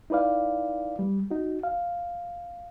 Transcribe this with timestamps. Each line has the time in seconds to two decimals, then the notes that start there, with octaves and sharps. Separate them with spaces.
0.10 D#4 E4 B4 D5 F5
0.99 G3
1.31 D#4 F#4
1.64 F5